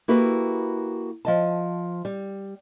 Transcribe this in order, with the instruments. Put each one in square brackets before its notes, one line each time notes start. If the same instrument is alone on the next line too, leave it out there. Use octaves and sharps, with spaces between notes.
[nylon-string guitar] A#3 E4 F#4 G4 A4 B4
F3 D#5 A5
G3